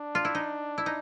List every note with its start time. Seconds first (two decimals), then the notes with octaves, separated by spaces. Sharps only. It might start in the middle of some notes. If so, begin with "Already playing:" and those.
Already playing: D4
0.15 F4
0.25 E4
0.35 D#4
0.78 E4
0.86 D#4